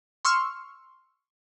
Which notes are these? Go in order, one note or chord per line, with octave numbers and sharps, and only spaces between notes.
C6 C#6 E6 F6